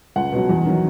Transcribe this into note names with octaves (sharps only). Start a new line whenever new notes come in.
C#2 F#5
B2 F#3
E2
D#3 F#3